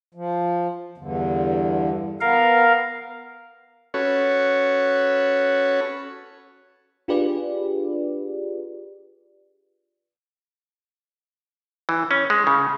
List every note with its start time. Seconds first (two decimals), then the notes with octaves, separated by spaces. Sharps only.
0.15 F3
0.98 E2 G2 D3
2.21 B3 A#4 F5
3.94 C#4 F#4 A4 B4 C#5
7.08 D4 F4 G4 G#4 B4 D5
11.89 E3
12.11 C#4
12.30 G#3
12.47 C#3